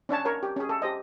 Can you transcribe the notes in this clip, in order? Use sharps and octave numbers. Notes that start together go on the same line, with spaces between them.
C#4 D4 C#5 A5
A#4 C#5
G4
C#4 G#4
A4
G4 C5 D#5